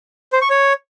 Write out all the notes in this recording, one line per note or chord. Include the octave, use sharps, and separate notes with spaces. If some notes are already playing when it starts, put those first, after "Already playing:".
C5
C#6
C#5